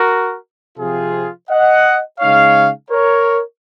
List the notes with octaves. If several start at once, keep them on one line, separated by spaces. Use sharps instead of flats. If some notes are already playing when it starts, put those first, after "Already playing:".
Already playing: F#4 A#4
C3 F3 C4 F4 G#4
D#5 F#5
C#3 G#3 D#4 C#5 F5
A#4 C#5